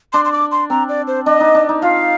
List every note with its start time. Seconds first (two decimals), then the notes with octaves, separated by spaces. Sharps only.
0.13 D4 C6
0.25 C6
0.32 D6
0.51 C6
0.70 C4 A#5
0.89 D5
1.07 C5
1.26 D4 D#5
1.40 D#4
1.55 D4
1.69 D#4
1.82 F4 F5